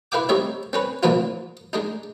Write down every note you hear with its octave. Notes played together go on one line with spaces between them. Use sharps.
E4 B4 F5 G5 D6
G3 C4 D#4 C#5 E5
C4 C#4 B4
A#2 E3 F3 C4 E4 F4
G#3 D4 D#4